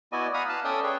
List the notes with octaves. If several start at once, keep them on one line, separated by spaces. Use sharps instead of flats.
B3 E4 F#4 D5 D#5 G#5
F5 F#5 G#5 A#5 B5 D#6
B4 F5 A5
C#4 A4 D5 E5 G5 D#6
G#4 B4 C#5